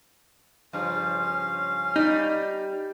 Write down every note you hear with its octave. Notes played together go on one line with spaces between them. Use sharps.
G2 C#3 F3 C#4 F5
G3 D#4